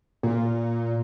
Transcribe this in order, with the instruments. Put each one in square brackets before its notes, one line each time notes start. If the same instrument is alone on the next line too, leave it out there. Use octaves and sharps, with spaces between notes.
[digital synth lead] A#2